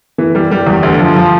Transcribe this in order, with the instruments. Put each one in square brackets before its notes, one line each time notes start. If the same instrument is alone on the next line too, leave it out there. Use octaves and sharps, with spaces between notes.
[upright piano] E3
G3
G3
E2
D2
F3
F3